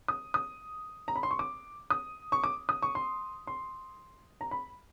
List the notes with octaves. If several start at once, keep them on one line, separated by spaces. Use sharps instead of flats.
D#6
D#6
A#5
B5
C6
C#6
D6
D#6
C#6
D6
D#6
C#6
C6
C6
A#5
B5